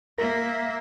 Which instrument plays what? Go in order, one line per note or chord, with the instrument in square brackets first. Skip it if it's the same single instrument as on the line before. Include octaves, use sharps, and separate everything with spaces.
[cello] A#3 E5 [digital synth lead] A#4